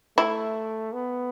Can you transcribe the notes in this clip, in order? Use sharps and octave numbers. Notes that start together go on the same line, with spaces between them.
A3 E4
B3